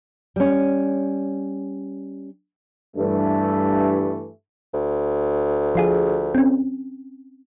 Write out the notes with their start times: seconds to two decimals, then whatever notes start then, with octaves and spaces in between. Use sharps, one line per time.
0.36 G3 C#4
2.97 G2 E3 A3
4.74 D2
5.75 F3 F4 G#4
6.35 C4 C#4